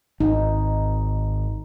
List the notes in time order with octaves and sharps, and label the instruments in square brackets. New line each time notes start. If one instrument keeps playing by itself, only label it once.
[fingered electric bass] G#1 [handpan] D#4